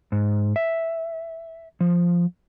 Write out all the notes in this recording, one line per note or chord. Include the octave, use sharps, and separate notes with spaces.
G#2
E5
F3